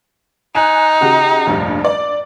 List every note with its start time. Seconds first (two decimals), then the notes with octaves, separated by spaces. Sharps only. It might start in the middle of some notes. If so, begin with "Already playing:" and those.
0.55 D#4 G#5 F#6
1.01 C#3 F#4 G4
1.46 F1 A#1 G2
1.85 D5